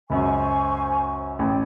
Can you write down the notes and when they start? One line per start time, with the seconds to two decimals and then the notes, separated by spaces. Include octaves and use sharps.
0.10 C#2 F#2 C5 G#5 C#6
1.39 A1 G5